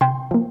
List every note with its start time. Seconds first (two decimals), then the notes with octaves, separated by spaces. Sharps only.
0.01 C3 G5 C6
0.31 F3 A#3